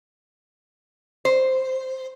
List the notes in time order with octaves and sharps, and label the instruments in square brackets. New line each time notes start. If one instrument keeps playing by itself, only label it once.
[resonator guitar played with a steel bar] C5